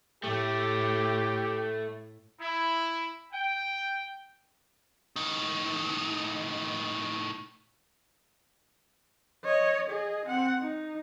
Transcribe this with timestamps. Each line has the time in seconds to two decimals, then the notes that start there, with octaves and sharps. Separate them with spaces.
0.24 A2 A3 G4
2.40 E4
3.33 G5
5.16 A2 D#4
9.45 C#5 D#5
9.90 G#4 D#5
10.26 C4 F#5
10.60 D#4